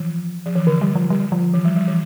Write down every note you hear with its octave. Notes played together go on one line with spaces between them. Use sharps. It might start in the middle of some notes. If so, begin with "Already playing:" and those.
Already playing: E3 F3
F3
E3
D3
G3
F3
D3 G3
F3
E3
G3
G3
E3